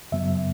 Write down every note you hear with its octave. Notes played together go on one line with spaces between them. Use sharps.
F#2 C#3 F#3 B3 E5